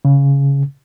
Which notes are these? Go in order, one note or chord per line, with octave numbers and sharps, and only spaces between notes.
C#3